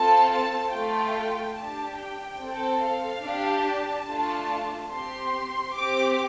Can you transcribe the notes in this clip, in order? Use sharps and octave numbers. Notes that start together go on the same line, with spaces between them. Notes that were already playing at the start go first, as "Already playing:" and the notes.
Already playing: C4 F4 A4 A5
A5
A3 F4 A4 G5
D4 G4 A5
G5
C4
A4
F5
D4 G4
A5
A3 D4 F4 A4
C4 G4 C6
C4 G4 D6